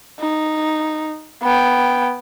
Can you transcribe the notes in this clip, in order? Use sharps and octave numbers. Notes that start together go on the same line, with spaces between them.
D#4
B3 G5